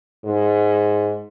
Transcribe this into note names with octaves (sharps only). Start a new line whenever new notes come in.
G#2